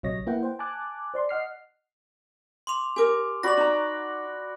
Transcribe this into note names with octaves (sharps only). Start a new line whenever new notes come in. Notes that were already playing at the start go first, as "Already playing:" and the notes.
A#1 C3 F#3 C#5 D#5 A#6
A#3 E4 B4 F#5 G5
C5 G5
G#5 A5 D6 F#6
C5 D5 C6
D#5 F#5 F6 C7
C6 D6 F7
G4 A#4 G#5 D6
F#4 D5 B5 A#6 F#7
D#4 A#5